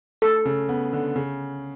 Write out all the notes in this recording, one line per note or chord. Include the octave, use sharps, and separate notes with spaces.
A3 A4
C#3
B3
D3
C#3